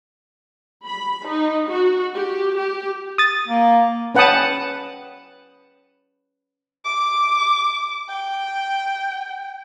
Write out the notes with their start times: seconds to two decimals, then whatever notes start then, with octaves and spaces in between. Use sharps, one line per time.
0.86 B5
1.26 D#4
1.70 F#4
2.14 G4
2.56 G4
3.18 D#6 A6
3.48 A#3
4.15 C#4 B4 F#5 G5 A5 D#6
6.85 D6
8.09 G5